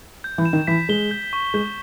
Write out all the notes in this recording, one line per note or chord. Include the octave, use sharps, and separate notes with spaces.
G6
E3
E7
D#3
E3 B6
G#3 G7
G6
C#6
G#3 G6